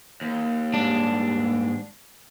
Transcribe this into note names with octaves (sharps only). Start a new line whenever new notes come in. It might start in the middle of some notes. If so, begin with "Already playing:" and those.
D#2
G#2 G3 G#3 D4